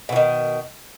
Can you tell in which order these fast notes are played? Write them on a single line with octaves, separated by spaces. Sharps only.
B2 E3 D#3